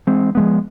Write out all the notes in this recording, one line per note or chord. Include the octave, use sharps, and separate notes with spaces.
E3 G#3 C4
F3 G#3 B3